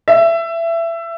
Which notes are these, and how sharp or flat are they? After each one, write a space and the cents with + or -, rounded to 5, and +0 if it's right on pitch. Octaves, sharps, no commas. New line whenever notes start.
E5 +20